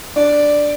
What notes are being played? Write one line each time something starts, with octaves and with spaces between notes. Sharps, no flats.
D4 D5